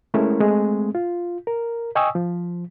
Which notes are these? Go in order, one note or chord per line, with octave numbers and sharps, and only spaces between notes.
G#3 A3 C#4 E4 A#4
G#3 A3 C4
F4
A#4
D#5 G5 G#5 C#6 D#6 E6
F3